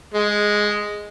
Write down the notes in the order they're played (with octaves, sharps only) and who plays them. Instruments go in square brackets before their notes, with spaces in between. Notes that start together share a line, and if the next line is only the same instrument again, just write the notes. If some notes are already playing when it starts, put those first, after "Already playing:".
[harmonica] G#3